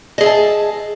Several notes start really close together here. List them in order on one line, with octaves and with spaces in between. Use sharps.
D#5 G#4 E5 A5